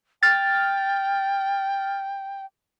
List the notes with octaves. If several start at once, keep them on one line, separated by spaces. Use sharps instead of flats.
G5 F6 A6